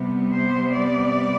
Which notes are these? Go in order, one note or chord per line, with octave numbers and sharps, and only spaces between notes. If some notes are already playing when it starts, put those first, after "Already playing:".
Already playing: C3 G3 B3
C5
D5